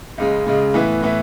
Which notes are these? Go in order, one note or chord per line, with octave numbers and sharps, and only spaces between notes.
C#2 C#3 G#3
C#2 C#3 G#3
A2 E3 B3 E4
A2 E3 B3 E4